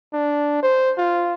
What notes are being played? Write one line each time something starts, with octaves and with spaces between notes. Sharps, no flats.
D4
C5
F4